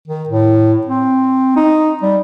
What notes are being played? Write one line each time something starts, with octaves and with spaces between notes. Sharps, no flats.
D#3
A2
C4
D#4
G3